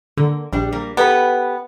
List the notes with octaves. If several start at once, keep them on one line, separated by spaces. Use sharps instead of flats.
D3 A#3
A#1 G3 D4
G3 A#3
B3 G4 A4 B4